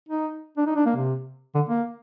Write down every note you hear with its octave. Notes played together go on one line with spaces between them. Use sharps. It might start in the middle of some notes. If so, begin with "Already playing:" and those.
D#4
D4
D#4
D4
A#3
C3
D3
A#3